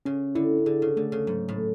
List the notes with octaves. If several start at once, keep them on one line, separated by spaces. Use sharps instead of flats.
C#3 C#4
D3 E4
D3 G#4
C#3
D3 A3
C#3
G#2 F#3
A2
A3